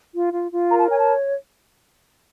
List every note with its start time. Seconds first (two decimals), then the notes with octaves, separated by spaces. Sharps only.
0.12 F4
0.32 F4
0.51 F4
0.70 A#4 A#5
0.79 A5
0.89 C#5 G#5
0.98 A5